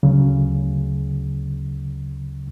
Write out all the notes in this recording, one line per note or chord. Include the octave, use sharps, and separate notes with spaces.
D2 C#3 F#3